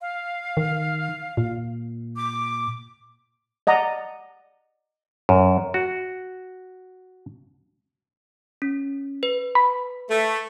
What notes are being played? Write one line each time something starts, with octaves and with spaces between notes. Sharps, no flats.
F5
D#3
A#2
D6
D5 D#5 F#5 A#5
F#2
F#4
C#4
B4
B5
A3